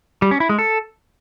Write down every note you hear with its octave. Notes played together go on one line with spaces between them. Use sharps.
G3
C#4
E4
G#3
A4